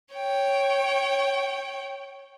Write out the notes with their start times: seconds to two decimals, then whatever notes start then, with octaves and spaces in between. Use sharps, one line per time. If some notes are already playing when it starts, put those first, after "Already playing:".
0.14 C#5 G5